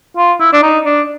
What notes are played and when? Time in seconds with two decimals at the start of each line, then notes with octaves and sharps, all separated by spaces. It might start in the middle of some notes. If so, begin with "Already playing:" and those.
0.17 F4
0.40 E4
0.53 D4
0.63 D#4
0.85 D4